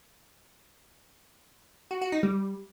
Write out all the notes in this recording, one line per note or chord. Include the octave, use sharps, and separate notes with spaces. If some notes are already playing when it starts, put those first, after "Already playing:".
F#4
F#4
D#4
G3